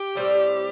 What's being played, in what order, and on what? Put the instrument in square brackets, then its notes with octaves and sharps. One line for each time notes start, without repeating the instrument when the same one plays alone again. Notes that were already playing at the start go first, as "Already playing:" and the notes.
Already playing: [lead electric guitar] G4
[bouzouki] A2 G3 C4